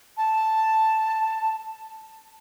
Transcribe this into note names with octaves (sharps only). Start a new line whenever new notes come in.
A5